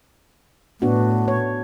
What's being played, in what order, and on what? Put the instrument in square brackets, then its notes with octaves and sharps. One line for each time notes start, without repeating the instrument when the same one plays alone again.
[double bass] A2 [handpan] B3 D4 F#4
[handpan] C#5